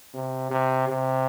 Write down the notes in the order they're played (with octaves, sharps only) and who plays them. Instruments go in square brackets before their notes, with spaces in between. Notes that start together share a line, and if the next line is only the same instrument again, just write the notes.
[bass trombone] C3
C3
C3